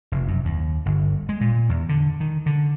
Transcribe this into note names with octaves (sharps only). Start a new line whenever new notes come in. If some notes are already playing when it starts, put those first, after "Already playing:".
F1
F#2
D#2
G1
G#3
A#2
E2
D3
D#3
D3